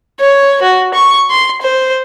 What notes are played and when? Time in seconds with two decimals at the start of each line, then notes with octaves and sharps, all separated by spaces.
0.20 C#5
0.62 F#4
0.94 C#6
1.30 C6
1.62 C5